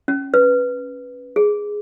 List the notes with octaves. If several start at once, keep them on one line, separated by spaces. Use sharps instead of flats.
C#4
B4
G#4